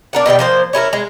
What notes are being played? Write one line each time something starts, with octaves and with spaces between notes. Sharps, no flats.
D4 A#4 F#5
B2 D#3 G3 G5
F3 A#3 C5
C#4 E4 A4 A#4
G#3